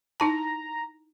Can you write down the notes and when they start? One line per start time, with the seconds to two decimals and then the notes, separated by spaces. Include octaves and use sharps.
0.20 D#4 E4 A5 A#5